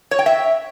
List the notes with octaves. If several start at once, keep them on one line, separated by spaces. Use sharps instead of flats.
C#5
G5
E5